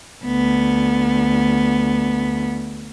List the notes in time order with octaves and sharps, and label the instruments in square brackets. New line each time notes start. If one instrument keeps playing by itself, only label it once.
[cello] D2 B3